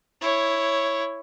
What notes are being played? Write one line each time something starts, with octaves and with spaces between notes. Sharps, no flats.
E4 C#5